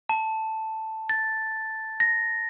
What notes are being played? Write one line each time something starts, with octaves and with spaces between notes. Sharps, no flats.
A5
A6
A#6